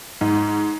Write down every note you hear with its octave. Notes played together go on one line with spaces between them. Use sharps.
G#2